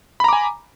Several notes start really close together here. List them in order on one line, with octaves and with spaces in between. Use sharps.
B5 A#5 D6 G#5